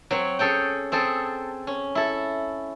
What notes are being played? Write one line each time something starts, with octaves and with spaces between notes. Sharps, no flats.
F#3 C4 C#5
C#4 G#4 A4 C#5 G5
C4 G#4 A4
C#4
E4 A4